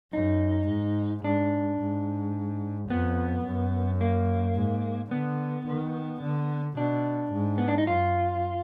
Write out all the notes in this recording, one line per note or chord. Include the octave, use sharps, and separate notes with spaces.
F#2 D#4
G#2
G#2 D4
G#2
F2 B3
F#2
A#3
G#2
D3 B3
D#3
D3
B2 D4
G#2
B3
D4
D#4
F#2 F4